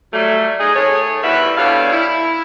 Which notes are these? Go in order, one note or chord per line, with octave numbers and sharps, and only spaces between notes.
F#3 G3 A3
G#3 D#4 G#4
D#3 A3 G#4 C#5
E2 E3 G3 F#4 B4 E5
G2 B2 G3 A4 C#5 F5
E4